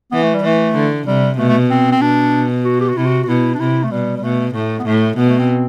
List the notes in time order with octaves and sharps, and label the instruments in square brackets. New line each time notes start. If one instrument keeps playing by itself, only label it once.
[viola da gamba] E3 [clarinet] B3
[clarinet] A3
G3
[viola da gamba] E3 [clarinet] A3
[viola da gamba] D3
[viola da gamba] C3 [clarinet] G3
[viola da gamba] B2 [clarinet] A3
[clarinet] A3
C4
C4
[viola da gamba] B2 [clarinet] D4
[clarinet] F#4
G4
F#4
[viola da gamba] C3 [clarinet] E4
[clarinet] F#4
F#4
[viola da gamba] B2 [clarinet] E4
[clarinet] D4
[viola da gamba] C3 [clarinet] E4
[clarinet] A3
[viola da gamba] B2 [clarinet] G3
[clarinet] G3
[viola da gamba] B2 [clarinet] A3
[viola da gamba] A2 [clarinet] A3
[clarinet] B3
[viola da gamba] A2 [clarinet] A3
[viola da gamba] B2 [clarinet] B3
[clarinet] A3
C4